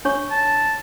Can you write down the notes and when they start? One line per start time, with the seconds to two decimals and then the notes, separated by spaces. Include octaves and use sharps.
0.05 D4 C#5 C#6
0.31 A5